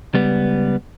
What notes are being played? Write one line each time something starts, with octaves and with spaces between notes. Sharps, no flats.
C#2 G3 B3